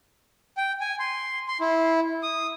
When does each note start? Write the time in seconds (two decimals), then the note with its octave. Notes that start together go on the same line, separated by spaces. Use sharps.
0.57 G5
0.81 G#5
0.99 C6
1.48 C6
1.61 E4
2.23 D#6